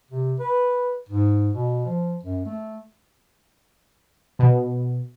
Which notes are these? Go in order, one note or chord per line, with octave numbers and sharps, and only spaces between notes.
C3
B4
G#2
B2
F3
F#2
A3
B2